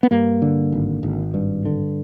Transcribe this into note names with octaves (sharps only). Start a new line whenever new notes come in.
B3
G2 A#3
D3
G#1
G#1
G2
D3